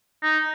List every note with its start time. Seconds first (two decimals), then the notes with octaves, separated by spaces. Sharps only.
0.23 D#4